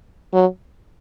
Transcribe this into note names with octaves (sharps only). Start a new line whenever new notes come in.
F#3